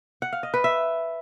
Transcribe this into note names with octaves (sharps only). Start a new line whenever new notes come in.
F#5
F5
D#5
B4
E5